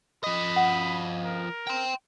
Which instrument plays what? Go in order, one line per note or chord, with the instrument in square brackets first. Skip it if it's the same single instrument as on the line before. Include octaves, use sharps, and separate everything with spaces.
[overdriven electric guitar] F3 D#5 [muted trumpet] B5
[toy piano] F#5
[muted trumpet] A#4
[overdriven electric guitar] G5 C6